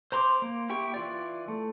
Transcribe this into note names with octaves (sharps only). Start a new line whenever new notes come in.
C5 A#5 C6 D6
A#3
E4 G4 G5 C#6
E3 F4 D5
A3